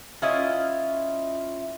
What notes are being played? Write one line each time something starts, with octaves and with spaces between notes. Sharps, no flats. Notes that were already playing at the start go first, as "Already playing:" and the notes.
C#4 E4 F4 D#5